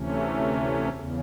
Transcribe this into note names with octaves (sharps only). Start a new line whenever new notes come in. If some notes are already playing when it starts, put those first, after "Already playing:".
Already playing: D2 C3 E3 A3 C#4
E2 C#3